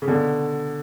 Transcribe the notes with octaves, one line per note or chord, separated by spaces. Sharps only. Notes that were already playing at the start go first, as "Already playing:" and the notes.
C#3
B2 D3